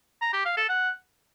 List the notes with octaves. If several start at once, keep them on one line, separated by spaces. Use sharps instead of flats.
A#5
G4
F5
A4
F#5